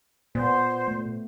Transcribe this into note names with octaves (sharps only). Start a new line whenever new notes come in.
A#2 B3 C5
A3